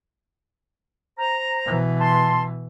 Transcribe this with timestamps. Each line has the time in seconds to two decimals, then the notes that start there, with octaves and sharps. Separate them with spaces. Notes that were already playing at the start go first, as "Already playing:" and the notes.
1.19 C5 A#5
1.66 B2 E3
2.00 A5 C6